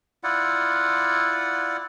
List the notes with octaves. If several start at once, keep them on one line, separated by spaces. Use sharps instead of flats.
E4 F4 D5 F#5